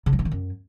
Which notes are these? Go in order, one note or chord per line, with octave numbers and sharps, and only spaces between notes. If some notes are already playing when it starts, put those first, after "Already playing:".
C#3
F#3
G2
D#3
F#2